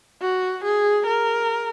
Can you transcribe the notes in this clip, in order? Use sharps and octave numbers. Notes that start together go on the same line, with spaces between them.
F#4
G#4
A#4